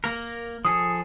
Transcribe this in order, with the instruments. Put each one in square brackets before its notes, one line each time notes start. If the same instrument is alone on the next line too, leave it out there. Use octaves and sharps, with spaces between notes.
[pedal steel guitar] A#3 A#4
[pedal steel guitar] F3 G#4 A4 [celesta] D#6